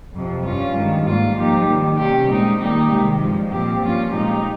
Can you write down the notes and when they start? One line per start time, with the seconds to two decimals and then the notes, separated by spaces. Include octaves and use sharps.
0.13 F2 C3 F3
0.45 G2 G3 C#4 F4
0.75 G2 D#3 G#3
1.06 G#2 G3 A#3 F4
1.37 F3 A#3 D#4 G4
1.66 D#3 G3 A#3
1.97 C3 G3 C#4 G4
2.28 A#2 G#3 C4 D#4
2.58 D#3 G3 A#3 D#4 G4
2.89 C3 D#3 G#3
3.19 G2 F3 G#3
3.50 A#2 F3 C4 G4
3.81 G2 F3 A#3 C#4 F4
4.12 A#2 G#3 D#4 G4